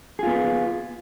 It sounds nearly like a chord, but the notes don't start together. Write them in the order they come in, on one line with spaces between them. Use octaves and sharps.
G#4 F4 B3